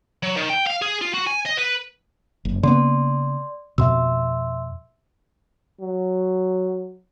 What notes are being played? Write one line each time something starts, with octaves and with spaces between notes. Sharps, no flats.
F#3
D#3
G5
F5
G#4
F4
F#4
G#5
D#5
B4
F#1
C#3 A#3 B3 D5 C6
F2 B2 E5 C6 E6
F#3